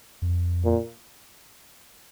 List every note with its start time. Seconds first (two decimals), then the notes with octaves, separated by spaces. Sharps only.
0.22 F2
0.65 A#2